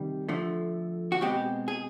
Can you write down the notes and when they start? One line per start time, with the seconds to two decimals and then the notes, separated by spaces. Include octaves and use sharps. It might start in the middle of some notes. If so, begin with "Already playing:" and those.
Already playing: C3 D#3 G3
0.29 D3 F3 A3
1.12 F#4
1.21 B2 G#3 C4 G4
1.68 G#4